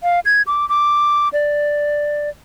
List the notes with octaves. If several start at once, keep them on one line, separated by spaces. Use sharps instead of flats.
F5
G#6
D6
D6
D5